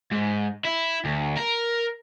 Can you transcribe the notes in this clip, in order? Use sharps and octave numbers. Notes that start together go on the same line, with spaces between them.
G#2
E4
D2
A#4